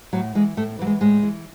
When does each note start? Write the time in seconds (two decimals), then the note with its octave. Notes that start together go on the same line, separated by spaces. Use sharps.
0.13 A2 F#3
0.35 E3 G#3
0.57 A2 A3
0.79 E3 F#3
0.86 G#3
1.01 A2 G#3
1.23 E3